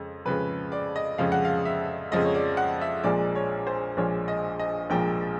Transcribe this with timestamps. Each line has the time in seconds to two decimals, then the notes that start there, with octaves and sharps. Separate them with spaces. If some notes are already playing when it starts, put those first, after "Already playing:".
Already playing: F2 C#3 G#3
0.25 F2 C#3 F3 G#3 B4
0.72 D5
0.96 D#5
1.18 F2 C#3 F3 G#3 F5
1.32 F#5
1.45 F5
1.65 E5
2.11 F2 C#3 F3 G#3 D#5
2.25 C#5
2.35 D5
2.57 F#5
2.81 E5
3.04 A#1 A#2 F3 G#3 D5
3.35 C#5
3.67 C5
3.97 A#1 A#2 F3 G#3 C#5
4.28 D#5
4.59 D#5
4.90 A#1 A#2 F3 G#3 G5